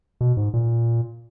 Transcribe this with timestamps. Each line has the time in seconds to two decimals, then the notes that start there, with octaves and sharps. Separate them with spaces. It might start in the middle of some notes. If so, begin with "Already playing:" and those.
0.21 B2
0.37 G#2
0.54 A#2